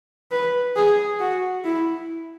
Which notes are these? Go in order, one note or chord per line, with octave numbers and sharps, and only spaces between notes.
B4
G#4
F#4
E4